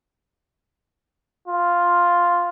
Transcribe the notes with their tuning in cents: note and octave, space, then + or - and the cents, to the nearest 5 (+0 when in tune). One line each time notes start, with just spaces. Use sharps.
F4 +0